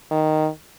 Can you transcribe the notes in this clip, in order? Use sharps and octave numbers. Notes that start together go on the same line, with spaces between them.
D#3